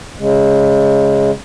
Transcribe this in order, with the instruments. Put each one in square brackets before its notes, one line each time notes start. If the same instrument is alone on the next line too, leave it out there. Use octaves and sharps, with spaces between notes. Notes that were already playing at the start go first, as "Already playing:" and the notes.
[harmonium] C#3 G#3